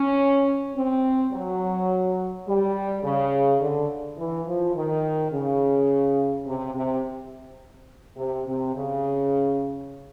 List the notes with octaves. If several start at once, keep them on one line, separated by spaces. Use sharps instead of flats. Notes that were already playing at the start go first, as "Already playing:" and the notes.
Already playing: C#4
C4
F#3
G3
C#3
D3
E3
F3
D#3
C#3
C3
C3
C3
C3
C#3